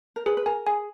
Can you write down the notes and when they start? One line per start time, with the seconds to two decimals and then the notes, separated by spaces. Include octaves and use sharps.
0.16 A#4
0.26 G#4 B4
0.37 B4
0.46 A#4 G#5
0.67 G#4 G#5